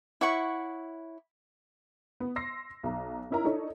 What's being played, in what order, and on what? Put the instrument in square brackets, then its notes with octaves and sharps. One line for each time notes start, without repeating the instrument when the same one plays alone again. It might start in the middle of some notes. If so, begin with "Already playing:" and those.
[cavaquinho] E4 C#5 F#5 C#6
[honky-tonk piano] B3
C6 E6 A#6 C7
B1 A#5
C#4 D#4 E4 A#4 A#5
D4 D#4 A4 C#5